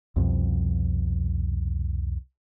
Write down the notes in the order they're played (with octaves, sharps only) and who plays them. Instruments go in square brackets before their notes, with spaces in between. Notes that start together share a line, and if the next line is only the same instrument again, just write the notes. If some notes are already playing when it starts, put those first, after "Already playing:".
[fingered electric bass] C2 F2 B2 F3